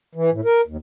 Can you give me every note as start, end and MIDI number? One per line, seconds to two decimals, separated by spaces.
0.15 0.30 52
0.32 0.41 45
0.45 0.61 70
0.67 0.77 39